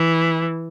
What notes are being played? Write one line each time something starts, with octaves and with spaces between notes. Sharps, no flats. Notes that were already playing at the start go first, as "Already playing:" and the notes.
Already playing: E3